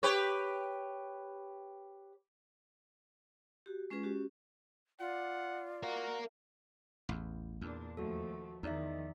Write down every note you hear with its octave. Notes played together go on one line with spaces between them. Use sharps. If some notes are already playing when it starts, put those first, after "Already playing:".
G4 B4 C#5
F#4 G4
G#3 C#4 F4 G#4 B4
C#4 F#4 G4
F4 D5 F#5
F#4 A#4 F5
A1 E2
E2 A#2 D4
D#2 F3 A3 F#4 A4
E2 D#3 F3 D#4 D5 E5